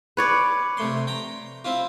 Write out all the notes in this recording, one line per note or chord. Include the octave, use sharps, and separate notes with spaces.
B4 C#5 D5
C3 A3 C6
G5 A#5
C4 E4 F4